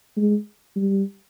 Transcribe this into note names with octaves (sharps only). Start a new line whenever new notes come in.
G#3
G3